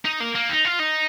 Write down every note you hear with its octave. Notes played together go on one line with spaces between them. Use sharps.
D#4
A#3
A#3
D#4
F4
D#4